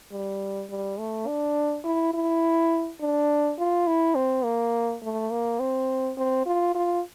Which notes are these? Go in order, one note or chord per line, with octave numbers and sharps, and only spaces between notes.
G3
G3
A3
D4
E4
E4
D4
F4
E4
C4
A#3
A3
A#3
C4
C4
F4
F4